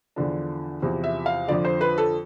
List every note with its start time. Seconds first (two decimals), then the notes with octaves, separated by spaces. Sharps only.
0.16 E2 D3 F3 D4
0.82 E2 C3 F3
1.04 E5
1.26 F5
1.48 F2 D3 F3 D5
1.65 C5
1.81 B4
1.98 A4